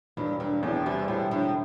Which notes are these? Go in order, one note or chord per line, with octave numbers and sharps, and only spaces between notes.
E1 G2
G2 D3
E2 A2
C3 G3
E1 A2
A2 D3